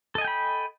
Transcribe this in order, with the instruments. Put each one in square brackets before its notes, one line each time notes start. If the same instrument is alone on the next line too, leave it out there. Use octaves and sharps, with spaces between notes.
[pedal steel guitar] A4
D#5
G#5
G5
B5